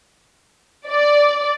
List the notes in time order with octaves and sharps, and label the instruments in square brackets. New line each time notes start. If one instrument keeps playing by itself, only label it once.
[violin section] D5